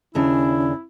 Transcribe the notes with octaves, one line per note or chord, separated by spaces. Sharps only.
D#2 C#3 C#4 D4 E4